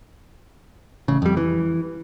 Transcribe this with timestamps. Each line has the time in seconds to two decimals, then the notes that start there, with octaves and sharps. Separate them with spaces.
1.08 A1 C#3
1.22 F2 G3
1.37 E3